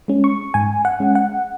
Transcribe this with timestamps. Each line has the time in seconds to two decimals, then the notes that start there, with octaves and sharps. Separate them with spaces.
0.08 G#3 C#4
0.24 C#6
0.54 G#2 G#5
0.85 F#5
1.00 G#3 C#4
1.15 F#5